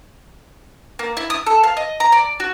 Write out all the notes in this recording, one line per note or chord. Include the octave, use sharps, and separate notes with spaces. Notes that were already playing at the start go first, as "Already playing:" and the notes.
A#3
E4
D#6
A4
F5
D#5
A#5
D5
F#4